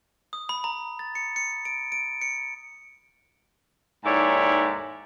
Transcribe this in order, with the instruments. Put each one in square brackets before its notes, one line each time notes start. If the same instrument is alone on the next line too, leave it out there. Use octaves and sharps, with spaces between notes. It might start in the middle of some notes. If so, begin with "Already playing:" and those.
[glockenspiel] D#6
B5
A#5
A6
C#7
C#7
D7
D7
C#7
[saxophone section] D#2 G#2 E4 A4 C#5 D5